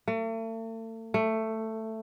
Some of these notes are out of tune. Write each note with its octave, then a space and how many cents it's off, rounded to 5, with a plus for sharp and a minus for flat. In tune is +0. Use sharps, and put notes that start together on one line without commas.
A3 +40
A3 +10